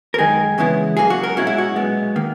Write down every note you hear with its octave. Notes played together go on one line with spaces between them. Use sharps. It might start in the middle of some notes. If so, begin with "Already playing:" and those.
A#4
F#2 D#3 G#3 D#4 G#4
E2 C#3 G#3 B3 E4
C#2 C#3 F#3 A#3 G#4
F#4
A#4
B1 A#2 G#3 C#4 E4 F#4
E4
F#4
B1 A#2 G#3 B3
D#3 A#3